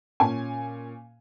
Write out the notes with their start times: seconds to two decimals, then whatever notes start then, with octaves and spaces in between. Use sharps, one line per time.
0.20 A#2 C#4 G#5